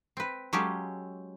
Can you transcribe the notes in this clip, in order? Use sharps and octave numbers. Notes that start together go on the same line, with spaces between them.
C4 B4
F#3 G#3 C#4 F4 G4 A4